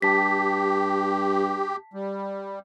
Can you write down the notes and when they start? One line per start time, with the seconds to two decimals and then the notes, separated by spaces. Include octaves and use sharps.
0.02 G2 G4 A5 B6
1.94 G3